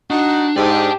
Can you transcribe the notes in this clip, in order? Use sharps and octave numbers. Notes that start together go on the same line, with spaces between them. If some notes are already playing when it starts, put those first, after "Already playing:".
D4 D#4 F#4
G#2 G4 D5 A5